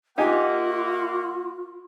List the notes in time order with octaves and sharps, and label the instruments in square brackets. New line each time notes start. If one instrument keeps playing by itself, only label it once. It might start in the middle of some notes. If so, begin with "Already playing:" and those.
[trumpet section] A#3 E5 F#5 [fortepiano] D#4 G4 G#5 [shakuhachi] F4